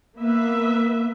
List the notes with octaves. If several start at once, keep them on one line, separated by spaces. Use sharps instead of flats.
A#3 B3 B4 E5